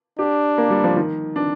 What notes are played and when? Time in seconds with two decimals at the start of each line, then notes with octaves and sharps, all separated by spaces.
0.19 D4 G4
0.58 A#3
0.70 G3
0.84 F3
0.96 D#3
1.36 D4